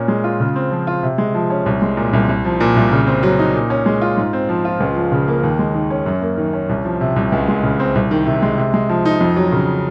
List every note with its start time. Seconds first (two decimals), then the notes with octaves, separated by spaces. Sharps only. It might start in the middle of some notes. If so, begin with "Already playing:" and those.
Already playing: A#2 C#4
0.08 G#3
0.24 F4
0.40 C#3
0.56 C4
0.71 F3
0.87 F4
1.03 C3
1.18 G#3
1.35 F3
1.50 C#4
1.66 C2
1.82 G#3
1.97 A#2
2.13 C2
2.29 C2
2.45 F3
2.60 A#2
2.76 C2
2.92 C#3
3.07 C4
3.23 F#3
3.39 D#4
3.54 A#2
3.70 C#4
3.86 G#3
4.01 F4
4.17 G#2
4.33 C4
4.49 F3
4.65 F4
4.80 C#2
4.96 F3
5.12 C#3
5.28 A#3
5.43 D#2
5.59 G#3
5.75 D#3
5.90 C#4
6.06 F#2
6.22 A#3
6.38 D#3
6.53 C#4
6.69 C2
6.85 F3
7.01 C3
7.16 C2
7.32 C#2
7.48 G#3
7.63 C#3
7.80 C4
7.95 C2
8.11 D#3
8.26 C3
8.42 G#3
8.58 C3
8.74 G#3
8.89 F3
9.05 D#4
9.21 F2
9.37 F#3
9.52 C#3